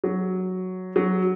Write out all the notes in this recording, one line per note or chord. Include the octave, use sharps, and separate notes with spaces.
F#3
F#3